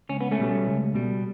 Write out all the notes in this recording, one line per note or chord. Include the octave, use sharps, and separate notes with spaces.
C#2 C#4
B3
A3 C#4
B2 G3
C#2
B2 G3